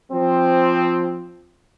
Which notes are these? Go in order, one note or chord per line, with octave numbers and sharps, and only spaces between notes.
F3 C4